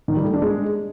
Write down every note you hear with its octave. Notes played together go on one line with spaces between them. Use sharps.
D#3
G3
A3
D4
G#3